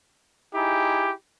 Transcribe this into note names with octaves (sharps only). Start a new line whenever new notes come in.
D#4 E4 G4 G#4